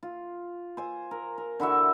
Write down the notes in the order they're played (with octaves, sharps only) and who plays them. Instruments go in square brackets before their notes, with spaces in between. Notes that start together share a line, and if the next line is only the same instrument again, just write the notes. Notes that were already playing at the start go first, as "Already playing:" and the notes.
[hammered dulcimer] F4
C5 G#5
A#4
A#4
D3 E4 F#4 E5